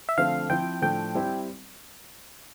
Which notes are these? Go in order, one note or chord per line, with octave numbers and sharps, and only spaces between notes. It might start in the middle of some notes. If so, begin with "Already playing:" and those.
E5
D3 F3 A3 C4 F5
F3 C4 E4 G5
A2 F3 A3 D4 G5
G3 C4 E4